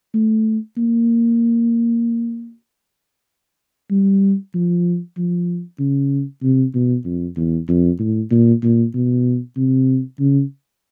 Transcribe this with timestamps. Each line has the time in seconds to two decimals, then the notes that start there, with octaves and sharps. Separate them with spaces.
0.14 A3
0.77 A#3
3.91 G3
4.55 F3
5.17 F3
5.79 C#3
6.43 C3
6.74 B2
7.05 F2
7.36 E2
7.69 F2
7.99 A2
8.31 A#2
8.63 A#2
8.94 B2
9.57 C3
10.20 C#3